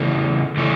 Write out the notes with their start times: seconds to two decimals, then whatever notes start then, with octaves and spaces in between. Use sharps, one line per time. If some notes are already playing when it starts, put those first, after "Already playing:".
Already playing: C#3 E3 A3 C#4 E4
0.57 C#3 E3 A3 C#4 E4